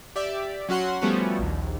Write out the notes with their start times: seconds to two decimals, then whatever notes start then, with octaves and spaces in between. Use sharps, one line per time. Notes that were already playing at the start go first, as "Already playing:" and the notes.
0.16 G4 D5 E5
0.69 F#3 C#4 F#4 F#5 C6
1.01 F3 G3 A3 B3 C#4 F#4
1.39 A#1 D#2